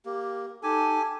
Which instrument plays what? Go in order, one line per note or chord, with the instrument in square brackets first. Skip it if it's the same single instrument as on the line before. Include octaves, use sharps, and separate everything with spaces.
[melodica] A#3 [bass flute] G4
[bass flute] D#4 [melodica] G4 G#5 [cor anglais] A4